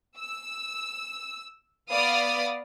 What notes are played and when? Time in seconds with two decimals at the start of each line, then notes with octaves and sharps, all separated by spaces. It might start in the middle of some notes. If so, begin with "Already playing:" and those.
0.18 E6
1.91 B3 D5 F5 B5 D#6 F6